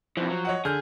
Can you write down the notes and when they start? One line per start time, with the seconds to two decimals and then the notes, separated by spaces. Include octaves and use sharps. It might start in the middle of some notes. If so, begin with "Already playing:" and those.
0.17 C3 E3 F3 C5
0.29 F#3
0.45 C#5 D#5 F#5
0.65 D3 G#4 F6 G6